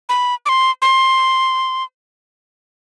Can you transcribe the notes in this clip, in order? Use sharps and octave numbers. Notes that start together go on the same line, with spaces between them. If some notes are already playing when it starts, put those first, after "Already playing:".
B5
D6
C6
C6